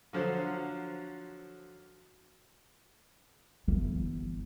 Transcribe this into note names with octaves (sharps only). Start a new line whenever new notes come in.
D3 F3 F#3 C5
G1 E3